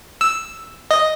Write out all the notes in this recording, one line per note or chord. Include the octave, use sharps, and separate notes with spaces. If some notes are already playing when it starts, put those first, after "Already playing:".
E6
D#5